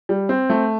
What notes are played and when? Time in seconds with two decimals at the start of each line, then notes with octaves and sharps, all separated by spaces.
0.09 G3
0.29 C4
0.50 A3